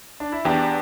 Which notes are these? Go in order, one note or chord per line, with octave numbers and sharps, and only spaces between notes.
D4
E4
E2 D4 G4